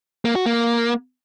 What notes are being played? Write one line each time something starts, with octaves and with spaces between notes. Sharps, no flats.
A#3
F#4
A#3